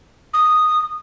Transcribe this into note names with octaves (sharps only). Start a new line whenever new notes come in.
D#6